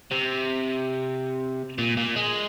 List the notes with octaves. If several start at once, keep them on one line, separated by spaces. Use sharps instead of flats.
C3
A#2
A#2
G#3